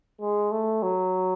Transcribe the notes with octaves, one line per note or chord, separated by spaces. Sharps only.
G#3
A3
F#3